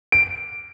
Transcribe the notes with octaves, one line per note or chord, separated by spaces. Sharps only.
D7